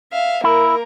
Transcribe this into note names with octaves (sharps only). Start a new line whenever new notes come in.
E5 F5
A#3 E4 A#4